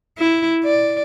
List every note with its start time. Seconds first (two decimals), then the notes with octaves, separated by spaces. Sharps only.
0.18 E4
0.64 D5